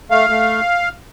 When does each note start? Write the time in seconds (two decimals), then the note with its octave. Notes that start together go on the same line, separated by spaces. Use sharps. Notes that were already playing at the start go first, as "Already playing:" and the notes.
0.11 A3 F5
0.29 A3